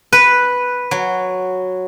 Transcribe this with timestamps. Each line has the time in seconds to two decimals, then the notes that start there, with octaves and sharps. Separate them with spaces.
0.13 B4
0.91 F#3